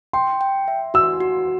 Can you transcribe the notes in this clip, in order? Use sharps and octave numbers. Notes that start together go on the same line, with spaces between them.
G5 C6
G5
E5
F#4 E6
F#4